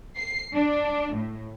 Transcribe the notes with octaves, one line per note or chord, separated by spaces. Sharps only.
C7
D4
A2